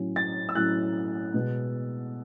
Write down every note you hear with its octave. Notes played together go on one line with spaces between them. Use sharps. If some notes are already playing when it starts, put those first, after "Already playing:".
Already playing: A2 F#3 C#4
A6
E6
A2 F#3 C#4 F#6
B2 G#3 B3